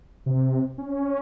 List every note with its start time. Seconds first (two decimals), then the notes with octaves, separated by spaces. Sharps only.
0.26 C3
0.78 C#4